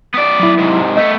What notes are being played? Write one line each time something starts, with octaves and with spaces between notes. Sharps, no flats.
B3 D5
F#3 E4
G#2 C3
A3 B3 D#5